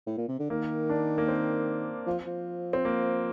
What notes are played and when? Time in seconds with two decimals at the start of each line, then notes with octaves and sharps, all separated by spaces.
0.06 A2
0.17 A#2
0.28 C3
0.39 D3
0.50 D#3 A#3
0.89 D4
1.18 A#3
1.28 C4
2.07 F3
2.26 F3
2.73 C4
2.85 A#3